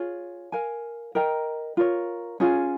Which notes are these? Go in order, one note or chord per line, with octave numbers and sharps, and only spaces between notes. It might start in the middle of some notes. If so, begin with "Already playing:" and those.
Already playing: F4 G#4 C#5
A#4 F5 G#5
A#4 D#5 G5 A#5
F4 A#4 C#5
C#4 F4 G#4